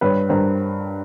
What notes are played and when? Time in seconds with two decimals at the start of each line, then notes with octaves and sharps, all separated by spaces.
0.01 G2 B4 C#5
0.29 G2 A#4 C5